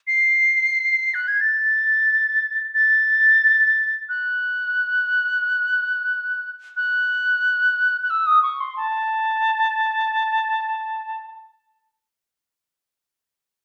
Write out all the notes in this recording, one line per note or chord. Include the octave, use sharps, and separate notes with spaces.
C7
F#6
G#6
A6
A6
F#6
F#6
F#6
E6
D#6
C#6
C6
A5